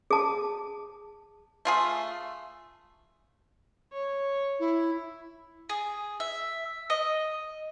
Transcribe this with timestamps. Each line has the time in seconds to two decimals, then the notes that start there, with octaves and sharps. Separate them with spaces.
0.10 G#4 A5
1.65 A3 F4 G#4
3.93 C#5
4.60 E4
5.69 G#4
6.20 E5
6.90 D#5